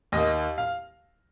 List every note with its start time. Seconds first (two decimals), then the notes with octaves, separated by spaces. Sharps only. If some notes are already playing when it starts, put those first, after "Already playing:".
0.12 D#2 D#3 D#5
0.58 F5